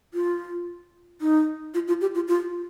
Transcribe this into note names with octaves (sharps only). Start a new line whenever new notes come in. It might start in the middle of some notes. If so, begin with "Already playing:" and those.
F4
D#4
F4
F4
G4
F4
F4